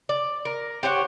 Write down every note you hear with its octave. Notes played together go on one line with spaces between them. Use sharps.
D5
A#4
G4 C5 C#5 F#5